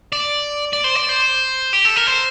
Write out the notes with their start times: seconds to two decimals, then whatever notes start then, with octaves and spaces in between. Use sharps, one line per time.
0.12 D5
0.73 D5
0.84 C5
0.95 D5
1.09 C5
1.73 G4
1.85 A4
1.96 A#4
2.07 C5